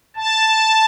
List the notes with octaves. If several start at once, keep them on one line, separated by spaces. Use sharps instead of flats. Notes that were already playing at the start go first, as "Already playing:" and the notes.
A5